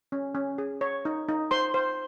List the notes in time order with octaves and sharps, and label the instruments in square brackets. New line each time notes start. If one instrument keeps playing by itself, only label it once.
[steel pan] C#4
C#4
G#4
C#5
D#4
D#4
C5 C6
C5